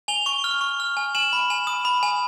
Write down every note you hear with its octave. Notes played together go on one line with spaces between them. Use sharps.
G#5 F7 G7
C#6
F6
C#6
F6
G#5
G#5 E7 F#7
B5
G#5
D#6
B5
G#5